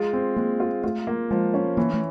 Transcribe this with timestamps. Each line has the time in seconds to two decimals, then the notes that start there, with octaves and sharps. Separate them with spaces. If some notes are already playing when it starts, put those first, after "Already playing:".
Already playing: G#3 F4
0.13 C4
0.36 G#3 A#3
0.60 F4
0.84 A3 F4
1.07 A#3
1.31 F3 G#3
1.54 C#4
1.77 E3 A#3
1.94 A3